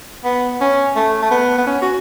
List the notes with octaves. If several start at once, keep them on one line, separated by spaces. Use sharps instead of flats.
B3
C#4
A3
A3
B3
B3
C#4
F#4